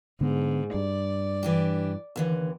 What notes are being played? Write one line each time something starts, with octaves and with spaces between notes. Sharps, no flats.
G#2 D3 B3
G2 D5
E3 D4 G4
D#2 D3 E3